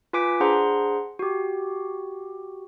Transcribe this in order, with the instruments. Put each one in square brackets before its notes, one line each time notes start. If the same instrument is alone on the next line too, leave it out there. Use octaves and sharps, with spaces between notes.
[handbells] F4 B4 G#5 D6 B6 D7
D4 G#4 C5 F#5 A#5 C6
F#4 G4